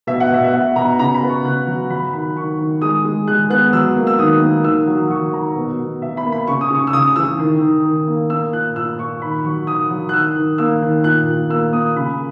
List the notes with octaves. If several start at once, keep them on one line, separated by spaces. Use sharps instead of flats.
B2 E5
F#5
B2 E5
E5
B2 F#5
B2 A#5
C#3 A#5
B5
B3
C#6
C#3 F#6
F#3
F#3 B5
D#3 B5
D#3 C#6
D#3
G#3 D#6
G#3
G#3 F#6
B3 F#6
F#3 E6
A#3
E6
D#3 D#6
A#3
D#3 E6
F#3
F#3 C#6
D#3 A#5
B2
B2
B2 E5
B5
A#3
B5
C#3 C#6
D#6
C#3 C#6
E6
C#3 D#6
E3 E6
D#3
D#3
D#3
A#3
A#3 E6
A#2 F#6
A#2 E6
A#2 C#6
D#3 B5
F#3 C#6
D#3 D#6
F#3
F#6
D#3 E6
D#3
A#3 E6
D#3
A#2 F#6
A#2
A#3 E6
A#3 D#6
C#3 B5